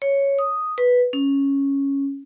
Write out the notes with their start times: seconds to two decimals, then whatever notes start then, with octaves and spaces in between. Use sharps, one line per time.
0.02 C#5
0.39 D#6
0.78 B4
1.13 C#4